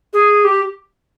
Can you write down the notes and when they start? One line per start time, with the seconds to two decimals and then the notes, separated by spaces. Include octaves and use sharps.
0.13 G#4
0.44 G4